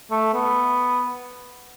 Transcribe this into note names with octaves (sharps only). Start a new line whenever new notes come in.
A3
B3